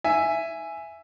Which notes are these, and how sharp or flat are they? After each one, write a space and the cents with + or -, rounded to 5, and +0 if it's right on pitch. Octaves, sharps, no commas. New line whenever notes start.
E5 +10 G#5 +0